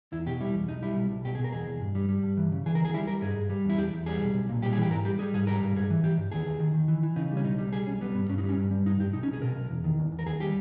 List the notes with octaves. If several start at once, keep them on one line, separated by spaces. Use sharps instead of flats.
E2 E4
B2 G4
G3 E4
E2
B1 D#4
G3 E4
B1
B1
B2 G4
G#4
B2 A#4
E2 G#4
E2
G2
G3
G3
G2
E3
C#3
E3 G#4
A#4
D#2 G#4
G3 E4
G3 A#4
G2 G#4
G2
G3
E2
E4
E2 G4
E2
G3 G#4
B1
B1
A#2
G3 G4
G#4
E3 G4
G#2 A#4
G3 G4
G3 G#4
G#2 G#4
G3 A#4
G#2
G2 G#4
E3
E3 G4
G2
D#2 G#4
D#2
D#3
D#3
E3
E3
C#3 D#4
G3
C#4
B1 D#4
G3
G3 G#4
B1 C#4
G3 B3
G2 B3
G2 C#4
D#4
G3
C#4
G2
G3
G2 D#4
G2 G4
B1 D#4
C#4
B1
G#4
B2 A#4
B1
E2
D#3
E2
E2
A#4
D#2 G#4
G3 G4